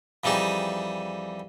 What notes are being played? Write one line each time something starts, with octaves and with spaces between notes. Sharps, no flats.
F2 E3 G3 D#4 G#4